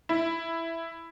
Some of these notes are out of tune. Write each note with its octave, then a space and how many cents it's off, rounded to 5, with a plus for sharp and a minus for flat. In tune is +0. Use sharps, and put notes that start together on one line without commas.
E4 +5